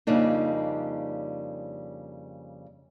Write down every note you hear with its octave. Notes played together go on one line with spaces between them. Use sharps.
F2 C#3 G3 A#3 D4 D#4